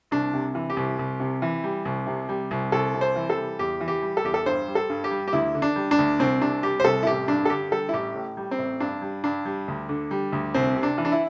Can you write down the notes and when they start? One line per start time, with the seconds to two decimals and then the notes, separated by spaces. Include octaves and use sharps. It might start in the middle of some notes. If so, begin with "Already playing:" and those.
0.11 C2 D4
0.34 C3
0.55 E3
0.70 G4
0.77 C2
0.99 C2
1.20 C3
1.42 E3
1.64 G3
1.85 C2
2.07 C3
2.29 G3
2.51 C2
2.72 C2 A4
2.94 C3
3.01 C5
3.16 E3
3.30 A4
3.37 G3
3.59 E2 G4
3.81 E3
3.88 G4
4.02 G3
4.17 A4
4.24 E2 G4
4.34 A4
4.46 G2 C5
4.68 G3
4.75 A4
4.90 G2
5.04 G4
5.11 G3
5.28 G4
5.33 D2 E4
5.55 D3
5.62 D4
5.76 G3
5.91 D4
5.99 D2
6.19 C2 C4
6.41 C3 D4
6.63 G3 G4
6.80 C5
6.85 C2 A4
7.03 E4
7.06 A1 G4
7.28 G2 D4
7.45 A4
7.50 D3 G4
7.72 G3 A4
7.89 E4
7.94 A1 G4
8.15 A2
8.37 G3
8.51 C4
8.59 A1
8.80 G2 D4
9.02 G3
9.24 G2 D4
9.45 G3
9.68 D2
9.89 D3
10.11 G3
10.32 D2
10.54 C2 C4
10.76 C3
10.83 D4
10.98 E3
11.05 D4
11.12 E4